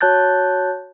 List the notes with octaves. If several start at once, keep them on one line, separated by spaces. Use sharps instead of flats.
F#4 C#5 A5 F#6 G6 A6